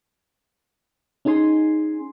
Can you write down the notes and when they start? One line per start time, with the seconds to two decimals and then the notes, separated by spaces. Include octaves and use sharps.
1.25 C#4 D#4 G#4 G#5 C6